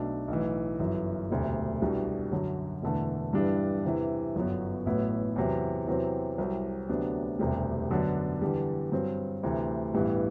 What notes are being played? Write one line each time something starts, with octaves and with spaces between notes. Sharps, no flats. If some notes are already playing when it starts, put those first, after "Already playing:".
Already playing: B1 B2 A3 D4
B1 A2 E3
G1 F#2 E3
E1 D2 C3
C2 B2 G3 D4
F#2 D3 F#3
E1 E2 D3 A3
G2 E3 G3 D4
E2 C3 E3
G1 F#2 F#3 B3
A1 A2 F#3 B3 E4
E2 C3 F#3
E2 C3 F#3 C4
C2 C3 F#3
D2 C3 F#3 B3 D4
E1 D2 C3 G3
F#2 D3 F#3 B3 D4
E2 D3 G3
G2 F#3 C4
D2 C3 E3
A1 G2 E3 G3 B3